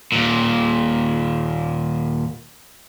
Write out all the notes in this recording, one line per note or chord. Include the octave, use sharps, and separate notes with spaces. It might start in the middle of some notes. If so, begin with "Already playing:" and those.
D#2 A#2